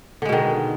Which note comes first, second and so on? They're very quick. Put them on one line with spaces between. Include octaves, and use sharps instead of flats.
D3 G#3 B2 D#3